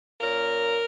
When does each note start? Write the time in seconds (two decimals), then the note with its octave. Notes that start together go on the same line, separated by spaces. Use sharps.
0.21 A#2 A#3 C#4 A#4